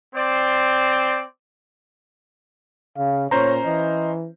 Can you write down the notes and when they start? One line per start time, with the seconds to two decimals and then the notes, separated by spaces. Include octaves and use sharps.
0.15 C4 C5 D5
2.97 C#3 F5
3.31 A#2 C#4 C5 C#5 A#5
3.65 E3 D#5